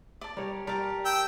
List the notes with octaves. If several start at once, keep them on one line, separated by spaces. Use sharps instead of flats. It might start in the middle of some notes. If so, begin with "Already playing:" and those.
D5 A5
G3 A#4 C#5
G3 A#4 A5
G5 E6